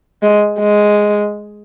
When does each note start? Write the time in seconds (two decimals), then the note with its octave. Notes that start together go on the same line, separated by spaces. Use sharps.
0.22 G#3
0.59 G#3